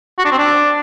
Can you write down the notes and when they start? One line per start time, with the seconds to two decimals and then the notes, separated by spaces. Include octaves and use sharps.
0.18 F#4
0.25 D4
0.32 C4
0.38 D4